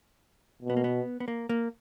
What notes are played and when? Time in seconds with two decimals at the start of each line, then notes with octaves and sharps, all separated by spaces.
0.62 B2
0.70 B3
0.77 A#3
0.84 B3
1.20 B3
1.28 A#3
1.49 A#3